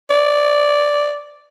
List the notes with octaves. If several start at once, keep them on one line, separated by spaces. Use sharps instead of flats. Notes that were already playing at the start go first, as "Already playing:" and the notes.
D5